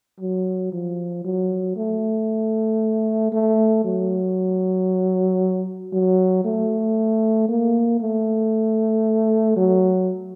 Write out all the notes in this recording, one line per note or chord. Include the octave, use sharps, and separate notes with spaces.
F#3
F3
F#3
A3
A3
F#3
F#3
A3
A#3
A3
F#3